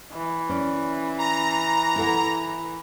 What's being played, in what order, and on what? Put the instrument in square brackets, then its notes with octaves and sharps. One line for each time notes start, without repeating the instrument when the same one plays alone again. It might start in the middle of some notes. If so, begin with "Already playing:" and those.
[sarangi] E3
[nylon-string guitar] C#4 D5
[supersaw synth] A#5
[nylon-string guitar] E4 A4 F#5